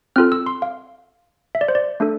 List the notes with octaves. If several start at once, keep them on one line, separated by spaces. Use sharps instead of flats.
C4 F4 A4 F6
E6
C6
F5
E5
D5
C5
D5
A3 D4 A4